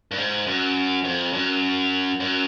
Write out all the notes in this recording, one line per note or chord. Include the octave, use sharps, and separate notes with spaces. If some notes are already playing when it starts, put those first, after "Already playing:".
G2
G#2
F#2
F2
F#2
F#2